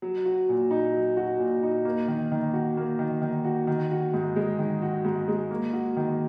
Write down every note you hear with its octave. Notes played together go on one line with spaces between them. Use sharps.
F#3
F#4
A#2
D#4
F#3
F#4
A#2
D#4
A#3
D#3
D#3
F#4
A#3
D#3
D#3
F#4
D#3
F#4
G#2
G#3
D#3
F#4
G#2
G#3
A#3
F#4
D#3